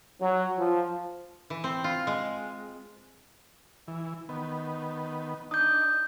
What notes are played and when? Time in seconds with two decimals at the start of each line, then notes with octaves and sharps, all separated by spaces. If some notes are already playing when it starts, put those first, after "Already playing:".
0.21 F#3
0.58 F3
1.50 E3
1.64 C4
1.84 F4
2.07 G#3
3.88 E3
4.29 D#3 B3
5.51 D4 D#4 D#6 G6